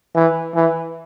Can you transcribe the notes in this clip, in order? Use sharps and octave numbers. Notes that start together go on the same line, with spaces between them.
E3
E3